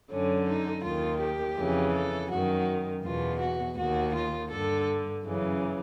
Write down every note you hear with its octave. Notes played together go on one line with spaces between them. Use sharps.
F#2 D3 C#4
D#4
D#2 D#3 F4
G4
F2 C#3 E3
A4
F#2 D#3 F#4
E2 B2 F4
F#4
D#2 D#3 F#4
F4
G2 D3 A4
F#2 C#3 E3